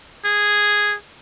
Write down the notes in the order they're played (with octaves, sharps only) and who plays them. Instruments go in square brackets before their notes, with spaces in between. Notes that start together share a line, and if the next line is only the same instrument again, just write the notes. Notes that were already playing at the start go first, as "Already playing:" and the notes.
[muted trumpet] G#4